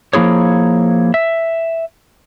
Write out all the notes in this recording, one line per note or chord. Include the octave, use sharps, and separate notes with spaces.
F3 A#3 E4 G#4 C#5
E5